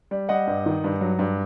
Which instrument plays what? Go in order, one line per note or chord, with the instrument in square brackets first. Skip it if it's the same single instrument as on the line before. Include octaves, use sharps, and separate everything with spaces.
[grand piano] G3
G3 D#5 F#5
G2
D#3
G2
F#3
G2